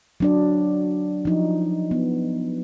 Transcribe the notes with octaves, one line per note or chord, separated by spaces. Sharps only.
F#3 D4 D5
F3 D#4
B3